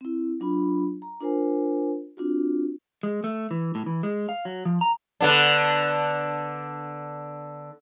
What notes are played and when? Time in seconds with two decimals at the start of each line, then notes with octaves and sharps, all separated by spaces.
0.01 C4 E4
0.40 F#3 D4 F4 B5
1.02 A#5
1.21 D4 F4 A#4 C5 G#5
2.17 C4 D4 F4 F#4
3.03 G#3
3.24 A3
3.51 E3
3.75 A2
3.86 E3
4.03 G#3
4.29 F5
4.45 F#3
4.65 F3
4.81 A#5
5.21 D3 B3 D4